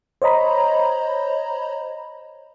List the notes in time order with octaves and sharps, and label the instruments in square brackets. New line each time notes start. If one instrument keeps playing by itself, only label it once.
[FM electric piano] C5 C#5 D#5 A#5 B5